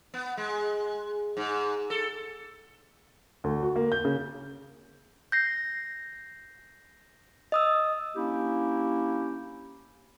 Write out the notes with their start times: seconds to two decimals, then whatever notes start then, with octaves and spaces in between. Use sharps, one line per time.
0.14 B3
0.37 G#3
1.37 G#2
1.90 A4
3.44 D2
3.63 F#4
3.76 A#3
3.92 G6
4.05 C#3
5.32 G6 A#6 C7
7.52 D#5 D#6 E6
8.16 A#3 C#4 D4 E4 G4